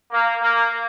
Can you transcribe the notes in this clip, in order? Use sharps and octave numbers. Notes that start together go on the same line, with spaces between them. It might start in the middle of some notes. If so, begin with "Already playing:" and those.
A#3
A#3